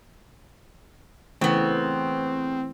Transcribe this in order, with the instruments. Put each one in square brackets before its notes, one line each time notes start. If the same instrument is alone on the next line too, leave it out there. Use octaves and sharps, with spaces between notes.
[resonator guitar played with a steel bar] C#3 B3 [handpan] E3 A3 [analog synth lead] C4